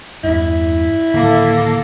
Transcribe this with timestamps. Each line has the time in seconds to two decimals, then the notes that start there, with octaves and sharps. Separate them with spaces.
0.24 E2 G2 E4
1.14 A2 D3 D#3 A#3 A4